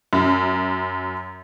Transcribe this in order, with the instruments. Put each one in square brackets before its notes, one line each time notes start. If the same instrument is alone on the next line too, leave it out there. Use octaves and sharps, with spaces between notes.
[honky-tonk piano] F#2